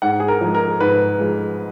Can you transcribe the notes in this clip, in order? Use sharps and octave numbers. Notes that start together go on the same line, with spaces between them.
G#2 F#5
G#4
A#4
F3 G#3
A#4
G#2 B4
F3 G#3